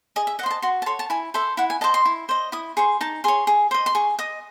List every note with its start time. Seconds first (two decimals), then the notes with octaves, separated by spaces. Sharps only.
0.16 G#4 D#5
0.27 E5
0.39 D#5 F#5
0.43 C5 C6
0.51 A5
0.62 F#4 C6
0.82 A5
0.86 A4 C#5 C6
0.99 A5
1.10 E4 G#5
1.34 A4 C5 E5
1.57 E4 F#5
1.70 G#5
1.81 C5 D#5 A5
1.94 C6
2.05 E4
2.29 C5 D#5
2.52 E4 D#6
2.77 G#4 C5 C#6
3.01 D#4 A5
3.24 G#4 C#5 C6
3.47 G#4
3.71 C5 D#5
3.86 C6
3.95 G#4 C#6
4.19 D#5 D#6